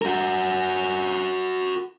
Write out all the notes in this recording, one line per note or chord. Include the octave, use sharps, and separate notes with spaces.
F#4 A#4